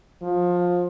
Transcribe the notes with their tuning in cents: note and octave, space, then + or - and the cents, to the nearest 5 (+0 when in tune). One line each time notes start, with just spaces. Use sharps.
F3 +20